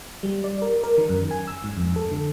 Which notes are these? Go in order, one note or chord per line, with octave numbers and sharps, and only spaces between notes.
G3
D5
A#4
A#4
D#3
F#2
G#5
E6
G#2
F2
A4
D3